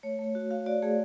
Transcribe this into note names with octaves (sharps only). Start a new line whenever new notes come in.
A3 C#5
A3
F#4
F#4 F5
F#4 D5
A3 G#4